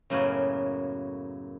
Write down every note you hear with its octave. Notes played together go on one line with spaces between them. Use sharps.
F#2 A2 C#3 A#3 B3 F#4